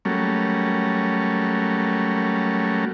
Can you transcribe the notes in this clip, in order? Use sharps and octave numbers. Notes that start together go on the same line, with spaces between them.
F#3 G3 A3 A#3 C#4